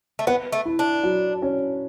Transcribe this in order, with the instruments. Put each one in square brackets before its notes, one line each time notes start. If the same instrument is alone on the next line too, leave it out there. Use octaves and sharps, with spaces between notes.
[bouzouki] A3
[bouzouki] B3 [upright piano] B4
[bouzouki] A3
[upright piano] E4
[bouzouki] D4
[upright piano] F#3
C#4